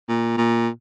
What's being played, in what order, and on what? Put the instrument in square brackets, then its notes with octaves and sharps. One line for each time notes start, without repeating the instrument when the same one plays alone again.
[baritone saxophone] A#2
A#2